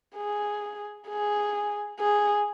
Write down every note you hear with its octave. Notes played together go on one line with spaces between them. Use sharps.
G#4
G#4
G#4